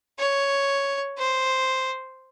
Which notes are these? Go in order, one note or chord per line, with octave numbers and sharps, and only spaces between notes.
C#5
C5